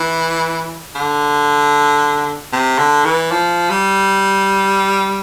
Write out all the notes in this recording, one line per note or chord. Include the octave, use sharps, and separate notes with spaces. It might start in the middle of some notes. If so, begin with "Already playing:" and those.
Already playing: E3
D3
C3
D3
E3
F3
G3